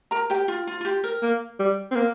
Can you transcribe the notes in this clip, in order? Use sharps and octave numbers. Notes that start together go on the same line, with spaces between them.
A#4 A#5
G4 G5
F4
F4
F4
G4
A#4
A#3
G3
C4
A#3